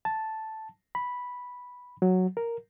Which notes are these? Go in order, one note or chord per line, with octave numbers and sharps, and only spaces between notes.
A5
B5
F#3
A#4